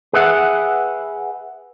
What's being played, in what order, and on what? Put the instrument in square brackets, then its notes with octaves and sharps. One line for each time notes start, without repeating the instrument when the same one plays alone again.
[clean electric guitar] G#4 B4 E5 F#5